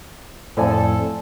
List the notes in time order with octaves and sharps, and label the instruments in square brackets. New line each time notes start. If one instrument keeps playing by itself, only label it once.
[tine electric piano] F2 A2 [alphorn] A4 [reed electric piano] C5 D5 G#5